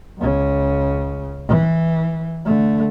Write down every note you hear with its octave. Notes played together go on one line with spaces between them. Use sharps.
C#2 C#3
E3
D3 A3